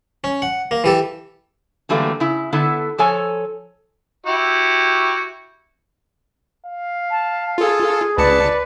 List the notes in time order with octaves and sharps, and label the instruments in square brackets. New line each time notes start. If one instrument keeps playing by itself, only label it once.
[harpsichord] C#4
F#5
A#3
E3 G4 A4
[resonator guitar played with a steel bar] D3 E3 F#3 G3 A3 A#3
C#3 E4
D3 B3 E4 A4
F3 A4 C#5 G#5
[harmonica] E4 F#4 G4
[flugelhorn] F5
[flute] A5
[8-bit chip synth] F4 A4 [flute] G#4
[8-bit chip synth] C#2 A5 C#7 [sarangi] B4 [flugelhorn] D5